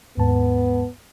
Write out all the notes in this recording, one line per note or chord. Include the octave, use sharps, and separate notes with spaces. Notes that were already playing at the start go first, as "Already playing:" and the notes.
D#2 G#2 B3 A5